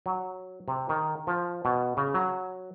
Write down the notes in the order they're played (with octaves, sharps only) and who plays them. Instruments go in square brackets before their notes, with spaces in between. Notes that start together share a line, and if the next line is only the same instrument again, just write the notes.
[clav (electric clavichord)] F#3
C3
D#3
F3
B2
C#3
F#3